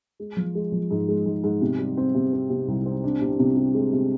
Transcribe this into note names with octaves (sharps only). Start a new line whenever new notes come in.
G#3
F3
G#3
F3
G#2
G#3
G#2
G#2
C3
G3
C4
C3
C4
C3
C2
C4
D4
C3
C3
C3
G#3
C3